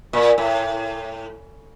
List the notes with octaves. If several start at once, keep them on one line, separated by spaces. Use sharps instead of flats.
A#2
A2